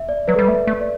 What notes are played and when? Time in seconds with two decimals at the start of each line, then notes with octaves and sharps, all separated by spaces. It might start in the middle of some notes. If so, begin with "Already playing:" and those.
Already playing: E5
0.09 D5
0.28 F#3 B4
0.36 G3 A4
0.44 B4
0.48 A3
0.55 E5
0.67 A3
0.81 D5